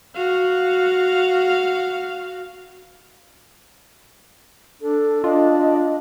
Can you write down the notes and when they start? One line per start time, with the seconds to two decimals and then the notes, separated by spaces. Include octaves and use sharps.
0.15 F#4 F5
4.82 D4 A4
5.24 D4 F4 D#5